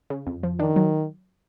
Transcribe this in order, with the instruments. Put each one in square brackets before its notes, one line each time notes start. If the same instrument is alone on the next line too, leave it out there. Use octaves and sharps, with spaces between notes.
[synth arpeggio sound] C#3
F2
F3
[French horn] D#3 [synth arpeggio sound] D4
[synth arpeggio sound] F#3